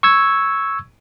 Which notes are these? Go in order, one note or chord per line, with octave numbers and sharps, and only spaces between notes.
C#6 E6 G#6